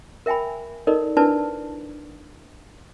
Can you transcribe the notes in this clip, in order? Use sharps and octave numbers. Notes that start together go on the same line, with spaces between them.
A#4 E5 G5 G#5 B5
D#4 A4 A#4 D5 D#5
D4 E4 A#4 B4 D5 A5